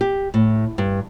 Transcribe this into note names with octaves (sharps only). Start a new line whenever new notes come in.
G4
A2
G2